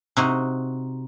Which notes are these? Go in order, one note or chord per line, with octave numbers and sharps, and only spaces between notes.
C3 D#4 F#4